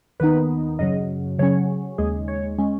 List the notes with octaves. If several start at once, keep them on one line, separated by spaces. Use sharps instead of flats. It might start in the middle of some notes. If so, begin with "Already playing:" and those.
D#2 D#3 B3 D#4 B4
F#2 C#3 F#3 D#5
C#3 F#3 C#4 C#5
D#2 C#3 G#3 G#4
C#5
G#3 C#4